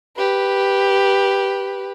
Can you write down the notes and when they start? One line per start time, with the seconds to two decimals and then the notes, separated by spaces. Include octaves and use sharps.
0.17 G4 B4